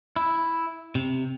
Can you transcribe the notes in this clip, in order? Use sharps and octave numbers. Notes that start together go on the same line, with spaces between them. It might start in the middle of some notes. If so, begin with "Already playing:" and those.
E4
C3